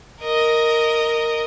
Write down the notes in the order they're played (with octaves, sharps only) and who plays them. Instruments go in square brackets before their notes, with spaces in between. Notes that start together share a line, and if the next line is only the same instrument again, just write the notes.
[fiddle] A#4 D#5